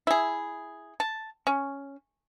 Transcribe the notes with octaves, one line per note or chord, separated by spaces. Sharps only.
E4 G#4
A5
C#4